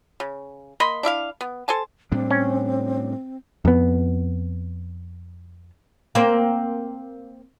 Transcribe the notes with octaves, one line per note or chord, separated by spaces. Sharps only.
C#3
A#3 D#5 B5 C6
D4 E4 E5 F5
B3
A4 C5 G#5 A5
A2 G3 C4 D4
C#4
F2 B3
A#3 C4